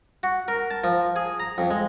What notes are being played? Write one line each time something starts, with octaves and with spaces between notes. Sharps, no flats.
F#4
A#4
A5
F3
G#4
A#5
F2
G#3